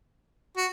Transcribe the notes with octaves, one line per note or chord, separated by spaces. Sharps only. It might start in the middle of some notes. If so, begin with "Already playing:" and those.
F#4